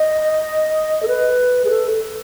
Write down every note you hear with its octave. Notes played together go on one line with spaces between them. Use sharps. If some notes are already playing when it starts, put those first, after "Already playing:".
Already playing: D#5
A4
B4
G#4
A4